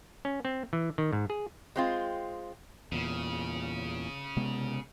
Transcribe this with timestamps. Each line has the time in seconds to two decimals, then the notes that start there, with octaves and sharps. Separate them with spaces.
0.25 C#4
0.45 C4
0.73 E3
0.98 D#3
1.13 G#2
1.30 G#4
1.76 G#3 C4 F4
2.92 E2 A#2 C#3
4.37 C3 G#3 B3